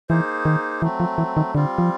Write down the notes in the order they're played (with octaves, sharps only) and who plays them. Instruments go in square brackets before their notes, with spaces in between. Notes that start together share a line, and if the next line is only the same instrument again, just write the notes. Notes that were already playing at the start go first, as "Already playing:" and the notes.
[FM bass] E3 [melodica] A#3 D#4 G#4 C5
[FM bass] D#3
[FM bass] E3 [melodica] F#3 A3 C4
[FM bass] F3
E3
D#3
[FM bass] D3 [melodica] G3 C4 F4
[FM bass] F3